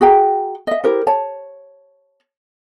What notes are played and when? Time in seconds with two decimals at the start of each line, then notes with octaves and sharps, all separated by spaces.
0.01 F#4 G#4 G5 A#5
0.67 D#5 E5
0.84 E4 G4 A#4 C5
1.07 C#5 A5